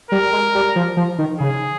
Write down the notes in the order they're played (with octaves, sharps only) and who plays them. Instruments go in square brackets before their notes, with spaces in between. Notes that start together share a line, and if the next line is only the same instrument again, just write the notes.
[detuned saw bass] G3 [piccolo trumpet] A#4
[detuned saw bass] G#3
G3
F3
F3
D#3
[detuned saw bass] C#3 [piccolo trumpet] G#4